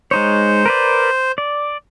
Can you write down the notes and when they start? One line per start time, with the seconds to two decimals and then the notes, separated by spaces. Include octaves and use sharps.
0.11 G#3 D#4 C5 C#5
0.66 A#4 B4 D5
1.38 D5